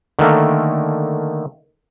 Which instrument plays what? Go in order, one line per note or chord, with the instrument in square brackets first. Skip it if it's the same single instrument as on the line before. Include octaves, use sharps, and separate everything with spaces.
[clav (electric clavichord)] D3 D#3 A3 A#3